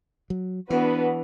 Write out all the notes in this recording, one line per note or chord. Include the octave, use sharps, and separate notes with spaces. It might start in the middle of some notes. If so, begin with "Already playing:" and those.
F#3
E3 B3 D4 F#4 B4